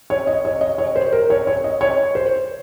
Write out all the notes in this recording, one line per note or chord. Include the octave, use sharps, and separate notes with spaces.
C#5
D#5
C#5
D#5
C#5
C5
A#4
C#5
C#5
D#5
C#5
C5